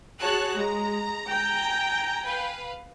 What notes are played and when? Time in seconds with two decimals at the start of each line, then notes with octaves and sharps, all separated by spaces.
0.20 F#4 G#4 C#5 A5 F#6
0.57 G#3 A#5
1.28 G5 G#5
2.24 B4 F5